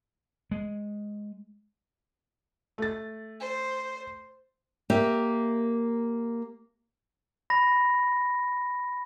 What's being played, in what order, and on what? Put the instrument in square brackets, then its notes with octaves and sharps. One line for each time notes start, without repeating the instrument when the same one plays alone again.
[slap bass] G#3
[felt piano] A3 A6
[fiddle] C5
[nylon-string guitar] A#3 G4 E5
[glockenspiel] B5 A#6